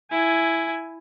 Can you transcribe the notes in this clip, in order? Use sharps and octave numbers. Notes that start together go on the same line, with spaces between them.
E4 G#5